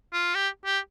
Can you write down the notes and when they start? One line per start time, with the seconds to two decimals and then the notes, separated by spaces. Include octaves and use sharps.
0.13 F4
0.35 G4
0.66 G4